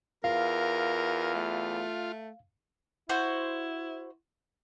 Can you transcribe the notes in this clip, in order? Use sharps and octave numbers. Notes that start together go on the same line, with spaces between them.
E2 F4 A#4 F5
A3
E4 F#4 C5